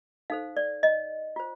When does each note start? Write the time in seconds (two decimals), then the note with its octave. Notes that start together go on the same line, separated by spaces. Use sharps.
0.30 D#4 A4 C5 F5
0.57 D5
0.83 D#5
1.36 F4 C5